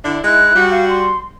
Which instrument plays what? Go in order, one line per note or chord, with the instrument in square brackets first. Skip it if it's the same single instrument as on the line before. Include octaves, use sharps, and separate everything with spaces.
[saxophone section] D3 D4 E4
[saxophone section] G#3 D#4 E4 [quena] F#6
[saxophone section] G3 F#4
[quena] F5
C6